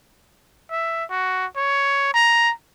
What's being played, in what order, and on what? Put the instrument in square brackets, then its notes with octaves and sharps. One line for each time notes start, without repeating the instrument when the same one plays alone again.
[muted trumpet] E5
F#4
C#5
A#5